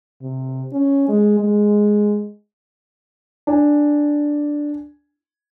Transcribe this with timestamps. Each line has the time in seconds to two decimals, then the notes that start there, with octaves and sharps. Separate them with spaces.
0.22 C3
0.73 C#4
1.08 G#3
1.40 G#3
3.47 D4 G#5